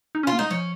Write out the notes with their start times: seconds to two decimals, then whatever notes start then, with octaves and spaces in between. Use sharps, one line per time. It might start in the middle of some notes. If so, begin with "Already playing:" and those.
0.15 D#4
0.23 C#4 F4
0.32 A#3
0.39 G#3 D#4
0.50 F3 C#4